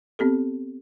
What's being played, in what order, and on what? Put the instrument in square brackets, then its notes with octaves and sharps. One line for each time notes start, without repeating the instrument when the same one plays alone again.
[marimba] B3 C4 G4 A4